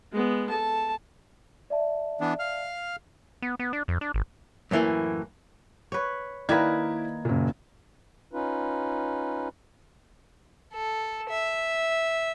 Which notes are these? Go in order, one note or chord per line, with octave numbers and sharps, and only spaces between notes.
G#3 B3
A4 A5
D5 E5 A5
E3 B3 D4
F5 F6
B3
B3
D4
F2
D4
G#1
F#2 A2 E3 A#3 E4
B4 C#5
D#3 A#3 E4 B4 D5 G#6
F#1 A#2
C#4 D#4 F4 B4
A4
E5